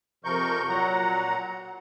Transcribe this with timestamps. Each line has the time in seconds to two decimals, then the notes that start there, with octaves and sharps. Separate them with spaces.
0.25 F2 C3 F3 A#4 C#6 G6
0.69 A#2 F#3 F#5 A#5